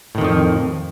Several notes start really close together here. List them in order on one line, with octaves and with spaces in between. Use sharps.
A2 D#3 F2 F3